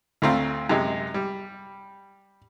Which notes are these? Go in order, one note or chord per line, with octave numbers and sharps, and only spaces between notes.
D2 A3 C4 F4 A#5
F#2 C3 G#3
G3